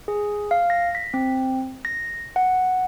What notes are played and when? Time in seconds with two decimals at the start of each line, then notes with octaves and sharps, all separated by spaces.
0.08 G#4
0.51 F5
0.70 A#6
0.95 B6
1.14 C4
1.85 A#6
2.36 F#5